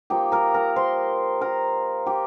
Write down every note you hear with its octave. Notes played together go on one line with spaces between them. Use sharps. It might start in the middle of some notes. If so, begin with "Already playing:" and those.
F3 A#3 D#4 G4 G5
A#4 A#5
A#4 A#5
C5 C6
A#4 A#5
G4